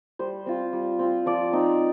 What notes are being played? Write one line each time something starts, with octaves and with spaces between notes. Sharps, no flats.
G3 C5
C4 F4
G3
C4 F4
F3 D5
C4 D#4